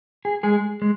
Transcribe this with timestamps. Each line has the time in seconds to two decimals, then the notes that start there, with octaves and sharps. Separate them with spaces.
0.25 G#4
0.43 G#3 G#4
0.82 G#3